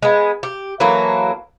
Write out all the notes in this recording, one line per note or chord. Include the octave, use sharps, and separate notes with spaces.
G#3 B3
G4
E3 F#3 A#3 A4